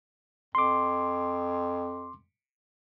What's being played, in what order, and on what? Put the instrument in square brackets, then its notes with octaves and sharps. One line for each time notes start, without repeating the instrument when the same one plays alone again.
[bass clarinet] F2 [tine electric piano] C6 D6